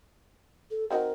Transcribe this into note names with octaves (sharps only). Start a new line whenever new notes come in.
A4
C4 D#4 F#4 A#4